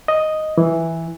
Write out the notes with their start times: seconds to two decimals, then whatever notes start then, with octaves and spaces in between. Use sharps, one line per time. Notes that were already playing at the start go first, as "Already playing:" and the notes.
0.08 D#5
0.58 E3